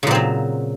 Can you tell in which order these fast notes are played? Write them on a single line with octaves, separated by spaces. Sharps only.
C#3 A#2 C4 F#3